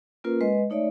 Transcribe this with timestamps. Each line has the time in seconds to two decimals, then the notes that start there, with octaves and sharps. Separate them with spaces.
0.24 A#3 C#4 F4 A#4 B4
0.41 G#3 B4 D#5
0.70 A3 D#4 C#5 D5 E5